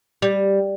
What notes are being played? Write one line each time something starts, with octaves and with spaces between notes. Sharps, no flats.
G3